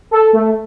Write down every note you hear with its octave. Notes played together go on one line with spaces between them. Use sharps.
A4
A3